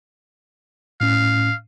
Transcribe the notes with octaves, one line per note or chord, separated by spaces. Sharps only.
A2 C#4 F5